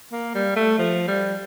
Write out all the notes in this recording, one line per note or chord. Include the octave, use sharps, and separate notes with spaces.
A#3
G3
A3
F3
G3